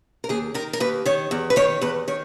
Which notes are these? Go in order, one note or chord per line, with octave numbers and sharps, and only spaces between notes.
A#4
D#2 G#4
D#3 A#4
A#4
D#2 B4
D#3 C#5
E2
B4
D#3 C#5
E2 B4
D#3 C#5